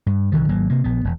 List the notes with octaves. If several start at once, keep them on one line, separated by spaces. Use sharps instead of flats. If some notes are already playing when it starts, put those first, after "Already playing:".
G2
C2 D3 D#3 F3
G#1 F#3 A#3
C3 A#3
A#1 B3
E1